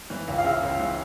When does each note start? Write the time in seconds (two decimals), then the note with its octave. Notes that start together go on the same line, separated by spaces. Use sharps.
0.10 E3
0.28 C#2
0.38 F5
0.44 C#3 E5
0.63 C#2
0.80 E3